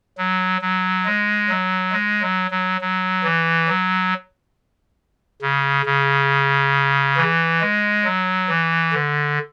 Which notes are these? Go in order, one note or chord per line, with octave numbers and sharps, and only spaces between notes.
F#3
F#3
G#3
F#3
G#3
F#3
F#3
F#3
E3
F#3
C#3
C#3
E3
G#3
F#3
E3
D3